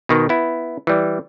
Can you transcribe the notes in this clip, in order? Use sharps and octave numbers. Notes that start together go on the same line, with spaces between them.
B2 D#3
B3 E4
E3 G3